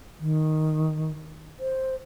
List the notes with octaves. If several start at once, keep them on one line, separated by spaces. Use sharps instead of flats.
D#3
C5